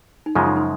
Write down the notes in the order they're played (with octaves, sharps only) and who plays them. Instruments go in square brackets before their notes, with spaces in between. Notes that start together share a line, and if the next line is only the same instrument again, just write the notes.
[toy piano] D#4
[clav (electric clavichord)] F#2 C#3 F3 G#3 [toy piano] F4
[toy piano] D#4
D#4